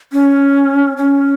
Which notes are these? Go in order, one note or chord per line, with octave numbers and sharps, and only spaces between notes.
C#4
C#4